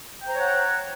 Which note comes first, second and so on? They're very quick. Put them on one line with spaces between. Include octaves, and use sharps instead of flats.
G5 C5 A#5 C#5 F#5